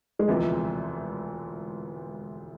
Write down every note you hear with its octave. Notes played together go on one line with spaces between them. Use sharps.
G#3
E1 D2 C3 E3 F3 B3